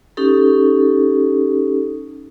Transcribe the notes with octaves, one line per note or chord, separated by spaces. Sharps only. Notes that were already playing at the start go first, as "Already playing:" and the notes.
C#4 D#4 G4 A4